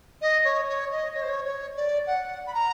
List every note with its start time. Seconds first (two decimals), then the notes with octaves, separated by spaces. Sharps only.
0.21 D#5
0.44 C#5
0.68 C#5
0.91 D#5
1.14 C#5
1.22 C5
1.28 C#5
1.44 C#5
1.76 D5
2.06 F#5
2.46 B5
2.54 A#5